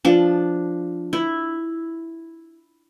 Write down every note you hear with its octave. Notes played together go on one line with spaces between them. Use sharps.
F3 D4
E4